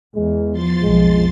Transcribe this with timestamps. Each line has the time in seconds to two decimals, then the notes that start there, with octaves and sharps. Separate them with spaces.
0.15 E2 G#3
0.52 F3 C6 A6
0.83 B1 F2 G#3